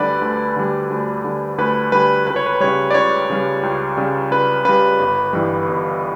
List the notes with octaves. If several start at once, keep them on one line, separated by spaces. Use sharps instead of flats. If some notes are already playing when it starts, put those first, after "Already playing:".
Already playing: D2 D3 G3 B4 D5
D2
D3 G3
D2
D3 G3
D2 B4
D3 G3 B4
C#2 B4
C#5
B4
C#3 G3 C#5
D5
C#2 C#5
C#3 G3
C#2
C#3 G3
C#2 B4
C#3 G3 B4
G1
G2 E3 G3
G1